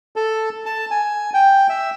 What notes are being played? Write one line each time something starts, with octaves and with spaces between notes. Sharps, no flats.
A4
A5
G#5
G5
E5